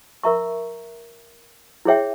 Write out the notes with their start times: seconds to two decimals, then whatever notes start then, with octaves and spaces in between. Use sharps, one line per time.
0.24 A#4 E5 A#5 C#6
1.85 E4 G#4 C#5 E5 G5